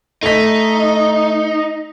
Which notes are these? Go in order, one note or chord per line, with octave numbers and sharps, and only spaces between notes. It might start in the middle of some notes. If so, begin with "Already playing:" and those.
A3 D#4 B6